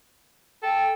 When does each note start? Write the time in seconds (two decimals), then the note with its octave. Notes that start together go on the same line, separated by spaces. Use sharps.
0.63 A4 G5